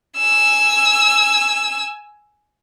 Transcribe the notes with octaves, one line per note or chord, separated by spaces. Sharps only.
G#5 E6